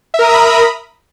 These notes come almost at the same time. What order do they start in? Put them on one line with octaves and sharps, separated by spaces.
E5 A#4 D#6 A#5 B5